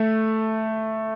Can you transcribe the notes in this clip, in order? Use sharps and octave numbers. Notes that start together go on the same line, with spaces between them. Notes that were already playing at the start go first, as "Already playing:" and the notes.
Already playing: A3